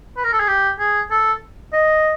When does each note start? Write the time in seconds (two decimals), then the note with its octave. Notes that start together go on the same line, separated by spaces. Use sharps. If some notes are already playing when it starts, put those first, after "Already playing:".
0.16 B4
0.24 A#4
0.33 A4
0.40 G#4
0.48 G4
0.79 G#4
1.11 A4
1.73 D#5